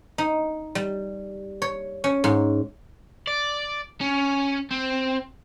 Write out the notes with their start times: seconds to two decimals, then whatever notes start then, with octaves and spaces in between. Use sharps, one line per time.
0.18 D#4
0.75 G3
1.62 C#5
2.04 C#4
2.24 G#2
3.27 D5
4.01 C#4
4.71 C4